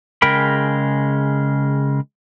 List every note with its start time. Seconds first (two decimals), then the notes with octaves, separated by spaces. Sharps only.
0.22 C#3 G#3 A#4 G5 B5